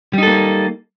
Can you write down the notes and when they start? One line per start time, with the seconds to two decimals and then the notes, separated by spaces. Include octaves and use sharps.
0.13 G3
0.18 D#4
0.23 A4
0.27 A#3